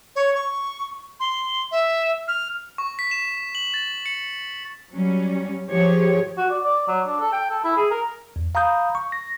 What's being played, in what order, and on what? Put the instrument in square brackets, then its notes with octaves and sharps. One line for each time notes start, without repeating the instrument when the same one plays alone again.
[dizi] C#5
C#6
C6
E5
F6
[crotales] C#6
B6
E7
F#7
A6
C#7
[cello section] F#3 G3 C#4
F3 G4 G#4 C#5
[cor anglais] F#4
D5
D5
F#3
D4
A4
G5
A4
E4
G#4
A#4
[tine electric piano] E2
F5 A#5 B5 D#6 G6
C#6
A#6